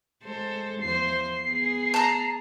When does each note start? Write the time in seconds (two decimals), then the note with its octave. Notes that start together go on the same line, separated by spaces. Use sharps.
0.23 G#3 A4 C5
0.81 E2 F3 C5 C7
1.44 B3 G#4
1.94 A5 A#5